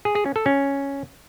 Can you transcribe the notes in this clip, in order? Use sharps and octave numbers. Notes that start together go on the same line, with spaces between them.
G#4
G#4
C#4
A4
C#4